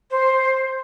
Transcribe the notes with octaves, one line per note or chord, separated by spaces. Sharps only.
C5